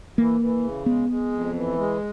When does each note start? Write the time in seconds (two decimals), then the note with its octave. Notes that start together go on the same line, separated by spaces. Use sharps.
0.17 E3 A#3
0.41 E3
0.63 C#3
0.86 G#3 B3
1.09 G#3
1.32 F2
1.55 E3
1.78 G#3